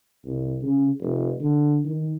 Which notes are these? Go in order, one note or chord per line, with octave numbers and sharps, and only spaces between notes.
C2
C#3
F1
D3
D#3